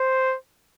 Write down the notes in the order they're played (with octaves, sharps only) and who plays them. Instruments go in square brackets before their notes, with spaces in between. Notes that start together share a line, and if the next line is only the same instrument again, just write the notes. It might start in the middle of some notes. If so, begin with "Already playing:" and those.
Already playing: [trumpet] C5